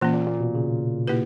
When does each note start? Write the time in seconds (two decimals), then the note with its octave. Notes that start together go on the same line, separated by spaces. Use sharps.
0.01 A#2 E3 A#3 C#4
0.14 A#2
0.27 A#2
0.40 B2
0.55 C#3
1.07 A#3 E4 G4 B4